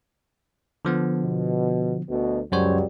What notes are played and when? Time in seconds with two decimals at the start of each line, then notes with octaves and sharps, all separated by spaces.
0.85 D3 F3 B3
1.23 B2
2.08 D2 B2
2.52 C#2 F#2 F#3 G3 C5 C#5